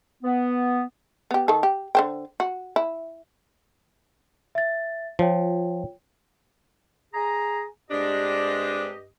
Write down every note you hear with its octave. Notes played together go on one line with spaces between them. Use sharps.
B3
B3 G4
D#3 A4
G4
D3 C5 G5
F#4
E4
E5 A6
F3 F4 C#5 G5
G#4 A#5
G2 G#3 C4 D4 G4 D#5